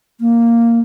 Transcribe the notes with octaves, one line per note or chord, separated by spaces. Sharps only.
A#3